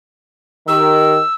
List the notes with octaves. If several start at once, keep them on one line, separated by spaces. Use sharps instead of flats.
D#3 G4 E6